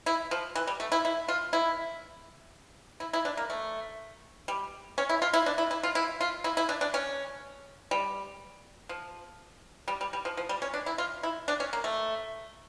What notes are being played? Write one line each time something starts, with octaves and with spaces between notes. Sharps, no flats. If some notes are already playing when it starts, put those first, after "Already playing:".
E4
F3
E3
G3
A3
E4
E4
F4
E4
E4
E4
D4
A#3
A3
G3
C#4
E4
F4
E4
D4
E4
E4
F4
E4
F4
E4
E4
D4
D4
C#4
G3
F3
G3
G3
G3
F3
F3
G3
C#4
D4
E4
F4
E4
D4
C#4
A#3
A3